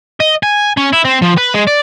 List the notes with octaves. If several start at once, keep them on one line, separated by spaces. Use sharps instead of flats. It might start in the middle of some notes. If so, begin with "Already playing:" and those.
D#5
G#5
C#4
E4
C4
F3
B4
G#3
D5